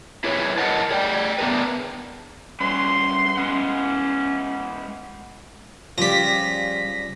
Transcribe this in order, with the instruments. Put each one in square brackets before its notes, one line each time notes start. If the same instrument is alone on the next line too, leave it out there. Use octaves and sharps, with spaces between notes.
[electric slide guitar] E4 G#4 B4 C#5
A#4 D#5 F#5 A5
G#4 D5 G5
B3 D4 G#4 A#4 B4
[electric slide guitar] G3 C#4 B4 [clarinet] C6
[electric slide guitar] G#3 B3 F#5 [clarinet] C#4
[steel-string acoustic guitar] C#3 G3 D5 [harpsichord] F3 G4 [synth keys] A#6 B6